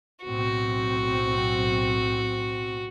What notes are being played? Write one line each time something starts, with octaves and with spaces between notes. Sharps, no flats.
B1 A2 C4 F#4